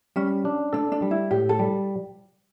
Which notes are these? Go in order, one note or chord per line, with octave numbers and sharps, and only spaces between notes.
G3 C#4
D4
D4 A4
D4
G3
E4
A2 G4
A4
G3